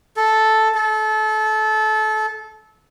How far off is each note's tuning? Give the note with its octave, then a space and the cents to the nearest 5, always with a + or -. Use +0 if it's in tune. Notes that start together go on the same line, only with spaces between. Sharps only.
A4 -5
A4 -25